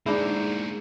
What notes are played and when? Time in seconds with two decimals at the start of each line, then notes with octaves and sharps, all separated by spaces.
0.06 G#2 A3 A#3 D4 E4 G#4 G6 C#7